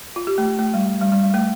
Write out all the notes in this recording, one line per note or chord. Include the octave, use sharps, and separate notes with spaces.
F4
G4
A3
A3
G3
G3
G3
G3
G3
A3